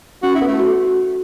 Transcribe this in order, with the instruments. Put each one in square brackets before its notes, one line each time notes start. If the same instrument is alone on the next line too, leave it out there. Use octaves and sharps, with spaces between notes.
[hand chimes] C#4 [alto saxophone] F#4
[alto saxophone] E4
[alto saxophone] B3 [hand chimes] A4
[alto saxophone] A3
[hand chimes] F#4